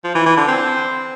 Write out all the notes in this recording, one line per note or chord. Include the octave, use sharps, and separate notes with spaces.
F3
E3
E3
D3
C4